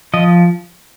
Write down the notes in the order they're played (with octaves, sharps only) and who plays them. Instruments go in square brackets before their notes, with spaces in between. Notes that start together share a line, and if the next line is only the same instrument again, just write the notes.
[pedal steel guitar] F3 D#5